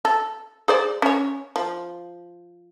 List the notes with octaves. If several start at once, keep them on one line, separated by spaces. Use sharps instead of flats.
A4
G#4 C5 D5
C#4 C#5
F3